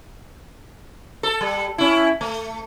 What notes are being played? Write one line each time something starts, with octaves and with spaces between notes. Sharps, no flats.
A4
G3
C#4 E4
A3